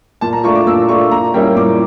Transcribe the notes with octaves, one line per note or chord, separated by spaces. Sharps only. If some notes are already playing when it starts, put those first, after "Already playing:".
A#2 A5
A#5
A3 D4 F4 C#6
D6
A#2 E6
A3 D4 F4 C#6
A#2 A#5
G3 A#3 C#4 E4 G5
A#2 D6